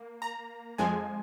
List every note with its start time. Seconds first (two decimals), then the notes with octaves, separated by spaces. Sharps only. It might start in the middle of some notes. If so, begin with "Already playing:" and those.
Already playing: A#3
0.22 A#5
0.78 F2 F3 G#3 G#5